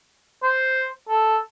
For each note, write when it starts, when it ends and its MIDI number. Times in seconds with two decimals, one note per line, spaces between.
0.43 0.86 72
1.09 1.38 69